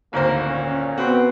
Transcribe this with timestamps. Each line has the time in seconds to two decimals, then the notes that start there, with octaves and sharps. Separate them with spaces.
0.13 G#1 D2 A#3 C5
0.46 A#2 C#4
0.98 B3 C4 F#4 B4